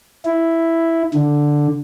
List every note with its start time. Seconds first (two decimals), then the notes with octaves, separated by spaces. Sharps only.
0.25 E4
1.14 D3